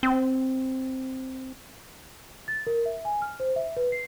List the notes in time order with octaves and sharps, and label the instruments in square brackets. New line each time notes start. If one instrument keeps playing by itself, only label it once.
[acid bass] C4
[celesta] A6
A#4
E5
G#5
F6
C5
E5
B4
C7